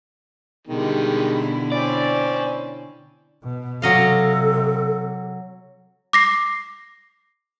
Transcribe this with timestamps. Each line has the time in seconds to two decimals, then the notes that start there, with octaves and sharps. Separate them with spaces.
0.67 B2 D3 D#3 G3 G#3 E4
1.72 C4 C#4 D5
3.44 B2
3.82 C3 F#3 A4 D#5 F5
6.13 D6 A#6 C7